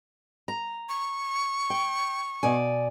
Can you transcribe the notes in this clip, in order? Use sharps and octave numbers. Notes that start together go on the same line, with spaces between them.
A#5
C#6
G5
B2 D5 G#5